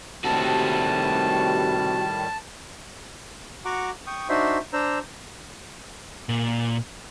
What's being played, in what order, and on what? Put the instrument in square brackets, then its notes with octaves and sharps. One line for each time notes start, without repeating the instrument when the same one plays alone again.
[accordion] A2 D#3 G3 [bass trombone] C3 [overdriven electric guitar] F#4 A4 [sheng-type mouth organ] A5
[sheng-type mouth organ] F#4 F#5 A#5 C#6 D6
G5 C#6 D#6
D4 D#4 F#4 C5 E5 C6
D4 C5 A#5 E6
[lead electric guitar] A#2